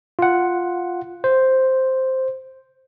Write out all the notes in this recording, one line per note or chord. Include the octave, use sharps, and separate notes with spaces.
F4 F#5
C5